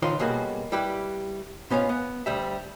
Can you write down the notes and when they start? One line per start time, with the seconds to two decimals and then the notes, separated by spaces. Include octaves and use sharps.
0.02 C#2 D#3 F3 F4 C6
0.20 B2 G3 A#3 C#4 F#4 G#4
0.72 G3 E4 G4 B4
1.70 G#2 B3 C#4 F4 F5
1.89 B3
2.26 D2 G3 E5